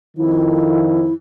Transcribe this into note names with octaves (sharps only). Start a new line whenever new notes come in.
F2 D#3 F3 E4